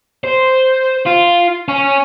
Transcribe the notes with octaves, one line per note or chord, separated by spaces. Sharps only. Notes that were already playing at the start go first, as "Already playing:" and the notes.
C5
F4
C#4